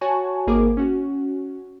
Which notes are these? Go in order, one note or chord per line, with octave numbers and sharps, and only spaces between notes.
F#4 C#5 G#5 A5 C#6
G#1 A#3 G#4 A#4 D6
C#4 F#4